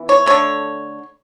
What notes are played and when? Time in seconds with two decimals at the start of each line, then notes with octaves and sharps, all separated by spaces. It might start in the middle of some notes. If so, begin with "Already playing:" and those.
Already playing: E3 B3
0.09 C#5
0.26 D3 A3 C#5